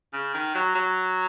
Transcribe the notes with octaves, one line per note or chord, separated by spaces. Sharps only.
C#3
D#3
F#3
F#3